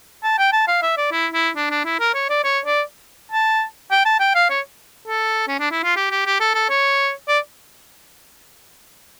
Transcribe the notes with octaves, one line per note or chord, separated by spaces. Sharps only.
A5
G5
A5
F5
E5
D5
E4
E4
D4
D4
E4
A#4
C#5
D5
C#5
D5
A5
G5
A5
G5
F5
C#5
A4
C#4
D4
E4
F4
G4
G4
G4
A4
A4
C#5
D5